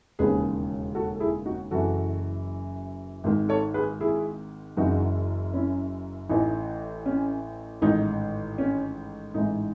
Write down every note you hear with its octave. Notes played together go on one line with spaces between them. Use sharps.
E1 D#2 C#3 G#4 B4
F#4 A4
A4
E4 G#4
D#4 F#4
F#1 F#2 E3 F#4 A4
G#1 G#2 D#3
A4 C#5
G#4 B4
E4 G#4
F#1 F#2 C#3 E3 D#4 F#4
C#4 E4
A1 A2 E3 D#4
C#4
A1 G#2 D#3 D#4
C#4
A1 G#2 E3 D#4